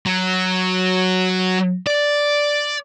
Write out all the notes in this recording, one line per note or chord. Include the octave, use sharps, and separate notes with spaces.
F#3
D5